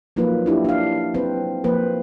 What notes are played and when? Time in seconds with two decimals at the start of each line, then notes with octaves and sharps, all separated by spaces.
0.16 F3 F#3 A#3 D#4 F4 B4
0.46 D4 E4 G4
0.65 D4 F5
1.14 F#3 C4 B4 C5
1.64 F3 A#3 B4 C5